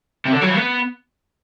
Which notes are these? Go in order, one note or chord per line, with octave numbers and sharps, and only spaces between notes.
C3
D3
F#3
E3
B3